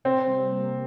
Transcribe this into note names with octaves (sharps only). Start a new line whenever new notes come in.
C3 C4
G3
A#3